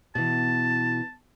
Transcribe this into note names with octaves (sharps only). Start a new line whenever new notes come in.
B2 E3 A5